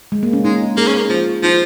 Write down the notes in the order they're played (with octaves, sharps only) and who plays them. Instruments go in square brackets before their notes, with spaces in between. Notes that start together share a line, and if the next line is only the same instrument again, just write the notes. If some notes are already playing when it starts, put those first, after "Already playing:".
[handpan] G#3
A#3
C#4
[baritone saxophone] G#3 [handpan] D#4
[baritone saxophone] A#3 [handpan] G#4
[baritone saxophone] C#4
A#3
[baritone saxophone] F3 [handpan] F4
[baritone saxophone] F3 [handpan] D#4